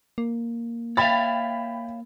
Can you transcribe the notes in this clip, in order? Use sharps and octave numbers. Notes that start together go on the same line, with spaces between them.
A#3
C#5 E5 F5 G5 B5 A6